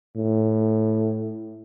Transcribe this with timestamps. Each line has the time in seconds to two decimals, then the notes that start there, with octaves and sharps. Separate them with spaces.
0.16 A2